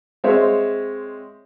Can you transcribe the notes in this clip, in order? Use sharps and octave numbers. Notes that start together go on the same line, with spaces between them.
G#3 C4 C#5 E5 F5